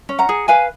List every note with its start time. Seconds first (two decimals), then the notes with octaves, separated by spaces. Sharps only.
0.09 C#4
0.19 F#5 A#5
0.29 G#4
0.48 B4 F5 G#5